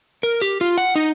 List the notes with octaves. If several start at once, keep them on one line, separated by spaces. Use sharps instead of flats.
A#4
G4
F4
F#5
D#4